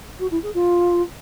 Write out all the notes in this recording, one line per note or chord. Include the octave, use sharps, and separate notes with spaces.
F#4
E4
G#4
F4